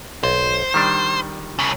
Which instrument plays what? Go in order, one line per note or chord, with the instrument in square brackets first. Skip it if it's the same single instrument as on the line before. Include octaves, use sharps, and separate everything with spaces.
[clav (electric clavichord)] B1 [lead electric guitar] C5
[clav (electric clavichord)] D#3 G3 D4
[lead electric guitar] C2 C#3